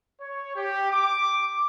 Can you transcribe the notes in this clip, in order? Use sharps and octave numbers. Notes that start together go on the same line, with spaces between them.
C#5
G4
D6